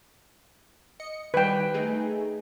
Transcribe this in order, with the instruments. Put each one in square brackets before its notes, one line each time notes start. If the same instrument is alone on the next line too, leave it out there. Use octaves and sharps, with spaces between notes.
[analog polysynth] D#5 C#7
[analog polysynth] D#3 G3 [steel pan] B4 G5
[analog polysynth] A3 D#4 G#4